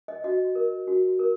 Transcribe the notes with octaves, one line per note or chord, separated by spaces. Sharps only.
D#5
F#4 D#5
A#4
F#4
A#4